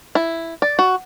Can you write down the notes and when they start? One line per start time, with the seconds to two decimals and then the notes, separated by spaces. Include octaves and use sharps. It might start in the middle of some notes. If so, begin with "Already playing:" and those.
0.15 E4
0.62 D5
0.79 F#4